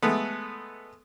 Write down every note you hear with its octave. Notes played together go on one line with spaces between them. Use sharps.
G#3 A3 B3